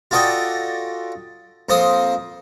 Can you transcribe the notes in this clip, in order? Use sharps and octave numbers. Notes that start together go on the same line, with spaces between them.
F4 F#4 A4 D5 D#5 G5
F2 A#3 C5 C6 D#6